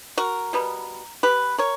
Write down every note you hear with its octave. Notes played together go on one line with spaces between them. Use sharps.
F#4 A#4
B2 G3 B3
G4 B4
A#4 C#5